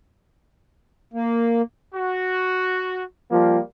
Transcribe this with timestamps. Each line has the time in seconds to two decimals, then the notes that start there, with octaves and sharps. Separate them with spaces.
1.13 A#3
1.95 F#4
3.31 F3 G3 A#3